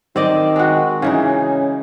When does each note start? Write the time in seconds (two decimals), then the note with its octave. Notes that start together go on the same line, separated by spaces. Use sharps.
0.16 D#3 C4 D5 D#5
0.56 G#3 F#4
1.02 C#3 E3 C#4 D#4